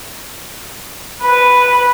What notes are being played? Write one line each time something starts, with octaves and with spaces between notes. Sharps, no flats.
B4